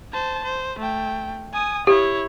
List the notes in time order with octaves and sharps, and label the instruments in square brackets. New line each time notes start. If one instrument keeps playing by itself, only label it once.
[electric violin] C5 A5
C5
A3 G5
G#5 D#6
[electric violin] E4 C#5 [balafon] G4